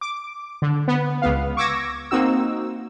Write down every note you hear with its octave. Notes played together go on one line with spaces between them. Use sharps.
D6
D3
B3
C#2 B3 F5
C#6 D6 E6 G#6 A#6
A#3 C4 D#4 F#4 E6